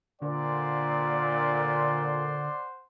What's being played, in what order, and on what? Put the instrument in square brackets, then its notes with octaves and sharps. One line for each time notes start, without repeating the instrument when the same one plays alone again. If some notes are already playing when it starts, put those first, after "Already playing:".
[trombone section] A#2 [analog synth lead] D3 [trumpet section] C5 F#5 C6 [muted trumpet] D5